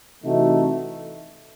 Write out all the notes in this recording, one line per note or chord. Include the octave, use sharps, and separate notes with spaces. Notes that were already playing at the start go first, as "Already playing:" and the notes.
C3 E3 A3 D#4 F#4